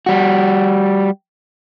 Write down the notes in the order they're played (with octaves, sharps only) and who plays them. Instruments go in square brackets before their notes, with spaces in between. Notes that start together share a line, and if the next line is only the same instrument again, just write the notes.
[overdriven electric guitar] G3 F#4